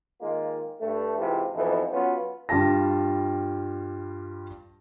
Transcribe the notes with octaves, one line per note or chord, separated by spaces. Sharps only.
D#3 G#3 A#3 F4
G2 A3
G#2 C3 E3 F4 G4
F2 G#2 B2 E3
F#3 B3 C#4 F4
G2 G3 F4 F5 A5 A#6